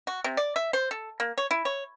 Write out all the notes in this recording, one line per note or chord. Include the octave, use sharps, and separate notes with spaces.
F#4
C3
D5
E5
C5
A4
A#3
C#5
E4
C#5